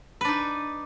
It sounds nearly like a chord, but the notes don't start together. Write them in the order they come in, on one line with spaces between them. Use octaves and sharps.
B4 D4 D#4